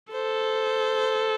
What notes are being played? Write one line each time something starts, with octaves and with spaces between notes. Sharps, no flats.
A4 C5